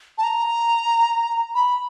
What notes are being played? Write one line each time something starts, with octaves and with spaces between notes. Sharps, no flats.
A5
A#5
B5